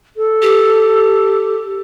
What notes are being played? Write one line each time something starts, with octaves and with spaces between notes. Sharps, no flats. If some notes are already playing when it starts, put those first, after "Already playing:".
A4
G4